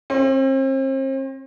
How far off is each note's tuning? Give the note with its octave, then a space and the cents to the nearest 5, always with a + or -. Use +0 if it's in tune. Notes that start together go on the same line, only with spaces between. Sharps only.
C4 +40